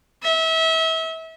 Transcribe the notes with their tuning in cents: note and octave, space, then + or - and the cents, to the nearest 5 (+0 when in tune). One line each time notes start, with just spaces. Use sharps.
E5 -30